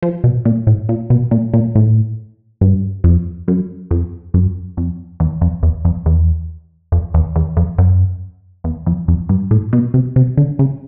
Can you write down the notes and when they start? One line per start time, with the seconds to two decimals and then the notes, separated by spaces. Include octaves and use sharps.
0.02 F3
0.24 B2
0.45 A#2
0.67 A2
0.89 A#2
1.10 B2
1.31 A#2
1.54 A#2
1.75 A2
2.61 G2
3.04 F2
3.48 F#2
3.91 F2
4.34 F#2
4.77 F2
5.20 E2
5.41 F2
5.63 E2
5.85 F2
6.06 E2
6.92 F2
7.14 E2
7.36 E2
7.57 F2
7.78 F#2
8.64 E2
8.86 F2
9.08 F2
9.29 G2
9.51 A2
9.73 B2
9.94 C3
10.16 C3
10.37 D3
10.59 C#3